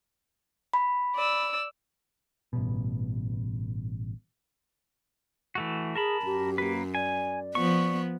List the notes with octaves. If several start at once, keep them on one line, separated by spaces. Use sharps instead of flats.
B5
D5 E6
A1 G2 B2
E3 A3 F#4
G#4 A#4 A5 B5
F#2 G4
A#3 B4
D5 G#5
F3 B3 C#6